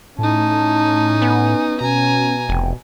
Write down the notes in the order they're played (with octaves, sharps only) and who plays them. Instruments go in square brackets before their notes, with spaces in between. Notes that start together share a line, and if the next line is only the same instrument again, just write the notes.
[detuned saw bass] A2 [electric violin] C#4 D#4 [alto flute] A5
[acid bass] B3 [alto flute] G#5
[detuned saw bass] B2 [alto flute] C#4 [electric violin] G#5 A#5
[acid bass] F1 [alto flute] G5